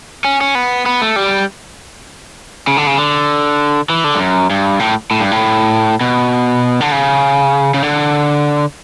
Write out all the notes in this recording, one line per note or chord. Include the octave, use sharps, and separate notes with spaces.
C#4
C#4
B3
B3
A3
G3
C#3
D3
C#3
D3
E3
D3
G2
F#2
G2
A2
A2
G2
A2
B2
D3
C#3
C#3
D3